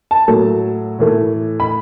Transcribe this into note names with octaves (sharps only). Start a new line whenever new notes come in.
A5
A2 F#3 A3
A2 E3 A3
B5